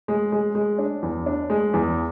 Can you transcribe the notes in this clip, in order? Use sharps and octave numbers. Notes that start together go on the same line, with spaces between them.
G#3
G#3
G#3
D4
E2
D4
G#3
E2